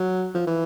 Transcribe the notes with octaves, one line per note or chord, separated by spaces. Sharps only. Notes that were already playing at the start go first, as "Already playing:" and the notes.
Already playing: F#3
F3
E3